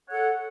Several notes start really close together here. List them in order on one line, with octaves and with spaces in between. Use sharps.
C#5 F#5 A4